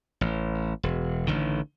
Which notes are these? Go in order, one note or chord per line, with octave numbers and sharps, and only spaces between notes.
A1
E1
A1 D3 D#3